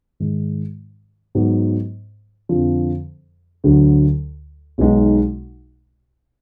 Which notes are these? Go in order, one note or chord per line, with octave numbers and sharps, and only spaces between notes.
G#2 D#3 G#3
G#2 F#3 B3
F2 D3 F3
D2 D3 F#3
B1 B2 G#3 D#4